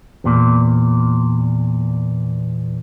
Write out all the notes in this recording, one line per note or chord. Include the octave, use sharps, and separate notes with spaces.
E2 A#2